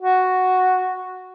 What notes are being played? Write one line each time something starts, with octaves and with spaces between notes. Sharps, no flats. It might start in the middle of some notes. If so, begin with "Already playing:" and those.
F#4